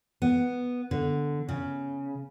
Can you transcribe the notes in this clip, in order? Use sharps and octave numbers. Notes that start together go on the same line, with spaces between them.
B3
D3
C#3